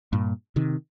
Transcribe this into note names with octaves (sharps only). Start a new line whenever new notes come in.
G2 A#2
C3 D#3